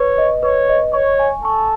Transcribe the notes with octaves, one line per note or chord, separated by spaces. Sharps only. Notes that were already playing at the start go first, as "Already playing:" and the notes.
Already playing: B4 C#5
D#5
B4 C#5
D#5
C#5 C#6
G#5
A4 C#6